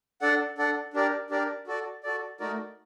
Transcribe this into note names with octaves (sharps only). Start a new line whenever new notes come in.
D4 A4 D5 F#5
D4 A4 D5 F#5
D4 G4 A#4 D5
D4 G4 A#4 D5
F#4 A4 D5
F#4 A4 D5
A3 D#4 F#4 A#4 D5